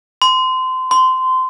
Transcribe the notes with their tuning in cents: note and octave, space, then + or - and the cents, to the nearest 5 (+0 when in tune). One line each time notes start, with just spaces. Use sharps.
C6 -25
C6 -20